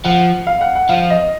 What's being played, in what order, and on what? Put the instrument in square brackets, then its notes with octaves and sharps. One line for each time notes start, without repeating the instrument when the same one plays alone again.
[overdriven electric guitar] F3 [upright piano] F#5
[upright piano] F5
F#5
F#5
[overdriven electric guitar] F3 [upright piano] F5
[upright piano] D#5